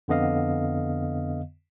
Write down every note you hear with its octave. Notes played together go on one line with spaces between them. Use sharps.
F2 D3 B3 D#5 F5